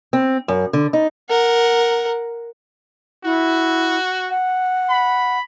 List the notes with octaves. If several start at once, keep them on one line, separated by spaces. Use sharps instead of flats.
C4
F#2
D3
D#4
A#4 F#5
E4 F#4
F#5
B5